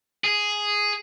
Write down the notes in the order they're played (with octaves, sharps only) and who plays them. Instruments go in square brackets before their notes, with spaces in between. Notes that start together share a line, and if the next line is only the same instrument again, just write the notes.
[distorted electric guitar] G#4